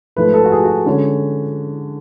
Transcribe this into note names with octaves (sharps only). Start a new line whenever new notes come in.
G#2 F3 A3 B4
A4
F#4
G#4
F#4
D3 G#3 C#4